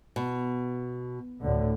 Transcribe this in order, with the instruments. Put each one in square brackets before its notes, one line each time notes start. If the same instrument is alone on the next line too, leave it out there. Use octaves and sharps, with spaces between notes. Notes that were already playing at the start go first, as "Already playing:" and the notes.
[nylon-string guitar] B2
[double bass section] D2 A2 D3